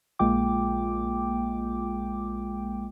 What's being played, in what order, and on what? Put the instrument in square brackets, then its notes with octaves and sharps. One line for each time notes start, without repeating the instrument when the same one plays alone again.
[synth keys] A#1 G#3 A#3 F4 G5 D6